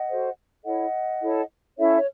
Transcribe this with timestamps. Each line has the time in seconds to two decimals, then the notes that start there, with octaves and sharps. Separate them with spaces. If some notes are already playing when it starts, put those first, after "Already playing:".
Already playing: D#5 F#5
0.09 F#4 A4 C5
0.65 E4 A4 C#5 D#5 F#5
1.21 E4 A4 C#5
1.77 C#4 E4 A4 C#5 E5
1.96 C#5